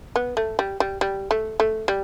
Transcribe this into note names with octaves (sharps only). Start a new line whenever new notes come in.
B3
A3
G3
G3
G3
A3
A3
G3